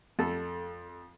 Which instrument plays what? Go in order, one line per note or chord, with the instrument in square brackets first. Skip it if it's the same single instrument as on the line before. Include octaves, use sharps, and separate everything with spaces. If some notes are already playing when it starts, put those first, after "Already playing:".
[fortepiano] F2 [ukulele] A4